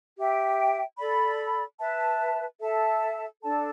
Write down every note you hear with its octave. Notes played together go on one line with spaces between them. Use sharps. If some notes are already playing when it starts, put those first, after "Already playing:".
G4 E5 G5
A4 D5 B5
B4 E5 A5
A4 E5 A5
D4 A4 D5 A5